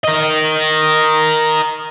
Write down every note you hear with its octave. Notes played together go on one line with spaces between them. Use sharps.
A#4 D#5